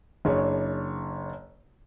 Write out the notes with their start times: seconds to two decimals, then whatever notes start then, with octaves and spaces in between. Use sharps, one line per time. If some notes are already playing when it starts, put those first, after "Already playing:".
0.25 F#1 D4 G#4 C#5